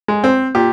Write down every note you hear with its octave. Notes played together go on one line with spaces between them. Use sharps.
G#3
C4
A#2 G4